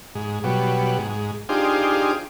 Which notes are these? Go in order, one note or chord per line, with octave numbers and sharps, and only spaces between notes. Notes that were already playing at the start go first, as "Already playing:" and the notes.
G#2
B2 F#3 G3
G#2
D4 D#4 F4 G4 G#4 C5